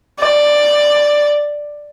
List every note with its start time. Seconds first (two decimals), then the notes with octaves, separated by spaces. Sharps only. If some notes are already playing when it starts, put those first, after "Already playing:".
0.20 D5